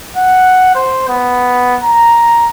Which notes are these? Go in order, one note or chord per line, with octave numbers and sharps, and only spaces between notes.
F#5
C5
B3
A#5